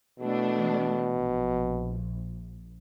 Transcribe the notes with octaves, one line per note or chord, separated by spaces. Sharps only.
B2 E3 A3 D4
A#1